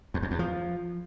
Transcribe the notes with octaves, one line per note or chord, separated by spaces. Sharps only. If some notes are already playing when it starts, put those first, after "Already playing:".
E2
F2
E2
F3